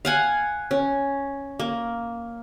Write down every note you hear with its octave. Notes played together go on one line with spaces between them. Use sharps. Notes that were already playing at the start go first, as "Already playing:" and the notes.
F5 F#5 G#5
C#4
A#3